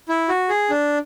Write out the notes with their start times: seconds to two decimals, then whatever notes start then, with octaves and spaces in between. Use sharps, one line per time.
0.09 E4
0.29 F#4
0.49 G#4
0.70 D4